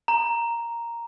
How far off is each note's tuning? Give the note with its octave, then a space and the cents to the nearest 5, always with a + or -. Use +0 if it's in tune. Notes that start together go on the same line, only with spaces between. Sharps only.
A#5 +0